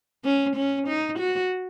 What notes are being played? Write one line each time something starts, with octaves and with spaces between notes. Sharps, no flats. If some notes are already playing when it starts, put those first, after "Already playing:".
C#4
C#4
D#4
F#4